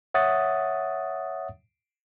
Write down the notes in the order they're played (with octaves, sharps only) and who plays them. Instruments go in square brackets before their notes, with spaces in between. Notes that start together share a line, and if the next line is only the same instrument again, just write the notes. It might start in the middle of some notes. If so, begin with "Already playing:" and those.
[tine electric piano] C#5 E5 F#5 D#6 A6